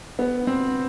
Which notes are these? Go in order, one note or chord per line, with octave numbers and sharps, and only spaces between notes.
B3
C4